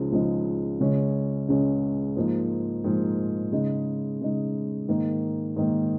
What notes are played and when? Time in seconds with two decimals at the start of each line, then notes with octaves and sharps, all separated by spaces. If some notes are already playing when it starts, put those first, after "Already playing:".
Already playing: C#2 C#3 F3 G#3 D#4
0.12 C#2 C#3 F3 G#3 D#4
0.80 C#2 C#3 G#3 C#4
1.48 C#2 C#3 G#3 C#4
2.16 G#2 F3 A#3 D#4
2.84 G#2 F3 A#3 D#4
3.52 C#3 G#3 D#4
4.21 C#3 G#3 D#4
4.88 G#2 D#3 A#3
5.56 G#2 D#3 A#3